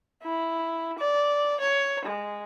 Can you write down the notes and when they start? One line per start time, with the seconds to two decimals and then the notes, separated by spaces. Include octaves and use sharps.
0.23 E4
0.99 D5
1.60 C#5
2.05 G#3